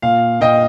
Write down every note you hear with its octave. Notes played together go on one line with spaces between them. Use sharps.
A#2 F5
A#2 D#5 G5